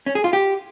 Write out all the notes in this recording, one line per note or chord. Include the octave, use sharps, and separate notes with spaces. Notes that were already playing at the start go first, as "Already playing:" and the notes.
C#4
G#4
F4
G4